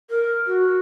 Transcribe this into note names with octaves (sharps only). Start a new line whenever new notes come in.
A#4
F#4